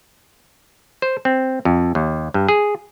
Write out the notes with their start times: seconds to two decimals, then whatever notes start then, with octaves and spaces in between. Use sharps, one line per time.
1.02 C5
1.25 C4
1.65 F2
1.95 D#2
2.34 G2
2.49 G#4